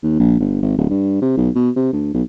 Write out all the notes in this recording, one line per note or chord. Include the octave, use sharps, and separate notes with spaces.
D#2
A#1
G1
G#1
D1
G2
C3
B1
B2
C3
D2
B1